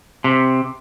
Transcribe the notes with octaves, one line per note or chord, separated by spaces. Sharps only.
C3